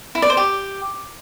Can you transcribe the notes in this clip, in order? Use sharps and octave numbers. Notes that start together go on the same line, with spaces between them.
E4
D5
C5
G4